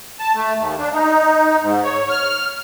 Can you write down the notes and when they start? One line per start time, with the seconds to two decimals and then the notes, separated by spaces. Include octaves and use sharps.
0.19 A5
0.35 A3
0.58 D#2
0.79 D4
0.92 D#4
1.62 G#2
1.83 C#5
2.10 F6